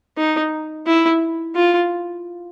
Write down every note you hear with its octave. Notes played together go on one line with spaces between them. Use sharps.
D#4
E4
F4